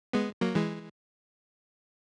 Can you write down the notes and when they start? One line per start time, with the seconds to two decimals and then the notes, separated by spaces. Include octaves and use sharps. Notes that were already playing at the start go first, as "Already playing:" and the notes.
0.13 G#3 B3
0.41 F#3 A#3
0.55 E3 G#3